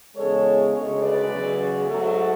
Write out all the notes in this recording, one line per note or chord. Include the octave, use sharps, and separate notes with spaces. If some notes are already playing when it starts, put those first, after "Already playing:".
E2 C#3 G#3 A4 C#5
D2 C#3 G#3 A4 C#5
B4 D5
E2 C#3 F#3
G#2 F#3 A3 F#4 A4